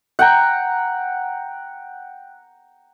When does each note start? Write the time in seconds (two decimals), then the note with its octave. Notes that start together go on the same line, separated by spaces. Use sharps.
0.19 F#5 G5 A#5